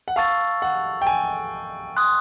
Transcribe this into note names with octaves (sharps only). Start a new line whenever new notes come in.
F#5
F5 A5 C#6 E6 A6
F#5
G5
G#5
C6 D#6 F#6